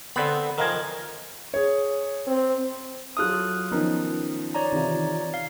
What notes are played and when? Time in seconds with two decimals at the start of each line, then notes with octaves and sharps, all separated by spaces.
0.16 D3 B3 C4 B5
0.58 D#3 F3 A#4 F5 G#5
1.54 G#4 C#5
2.27 C4
3.17 F#3 F4 A4 D#6 F6 F#6
3.71 D#3 F3 B3 C#4 D#4 A#4
4.54 C#5 D5 A#5
4.73 C3 D#3 E3 C4 F4
5.34 F5